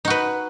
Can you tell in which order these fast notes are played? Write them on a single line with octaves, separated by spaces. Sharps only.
D#4 F#4 B4